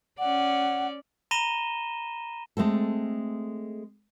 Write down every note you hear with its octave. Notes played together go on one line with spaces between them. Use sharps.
C#4 D5 F#5
A#5 B5 A#6 D#7 E7 G7
G#3 A3 C4 A4